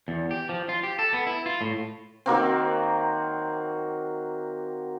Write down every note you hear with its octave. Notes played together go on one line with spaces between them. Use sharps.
E2
G4
F3
F4
G4
A4
B3
E4
F4
A2
D#3 F#3 A#3 C4